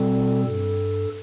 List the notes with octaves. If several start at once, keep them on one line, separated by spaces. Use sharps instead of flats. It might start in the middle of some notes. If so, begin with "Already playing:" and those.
Already playing: B2 G3 C4 A4
G2 A4